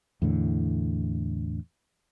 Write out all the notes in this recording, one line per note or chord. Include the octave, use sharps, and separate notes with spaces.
E2 A2 D3